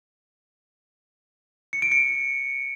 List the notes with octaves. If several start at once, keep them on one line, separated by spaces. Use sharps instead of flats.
C#7
D7
C#7